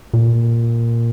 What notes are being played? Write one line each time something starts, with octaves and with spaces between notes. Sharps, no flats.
A#2